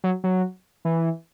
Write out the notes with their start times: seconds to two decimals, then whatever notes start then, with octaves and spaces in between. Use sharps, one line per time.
0.04 F#3
0.24 F#3
0.85 E3